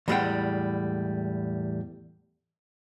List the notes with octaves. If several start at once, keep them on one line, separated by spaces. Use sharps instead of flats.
E2 A2 G3 G#3 F#5 G5